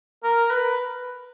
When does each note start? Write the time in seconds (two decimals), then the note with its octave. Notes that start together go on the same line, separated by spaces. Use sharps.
0.24 A#4
0.51 B4